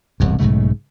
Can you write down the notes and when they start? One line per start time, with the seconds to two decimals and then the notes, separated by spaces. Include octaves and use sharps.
0.20 E1 C2 G2
0.39 B1 G#2 C#3 A3